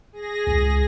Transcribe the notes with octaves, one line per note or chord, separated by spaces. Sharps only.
G#4 A#6
C#2